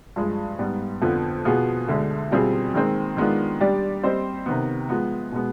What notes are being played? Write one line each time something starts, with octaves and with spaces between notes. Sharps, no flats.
G2 F3 G#3
G#2 G3 B3
F2 D3 F3 B3
B2 B3 F4 G#4
D2 D3 G#3
B2 G3 C4 F4 G#4
D#3 G#3 C4
D#3 G#3 B3 D4 F4
G3 D4 G4 D5
G3 C4 G4 C5 D#5
C3 D#3 B3
F3 G#3 B3
B2 G#3 B3